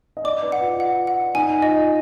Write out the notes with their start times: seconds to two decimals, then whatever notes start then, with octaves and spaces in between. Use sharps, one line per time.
0.17 D#5
0.24 D5 D6
0.43 B4
0.52 F#5
0.61 F4
0.80 F#5
1.07 F#5
1.35 D#4 G#5
1.62 F4 D#5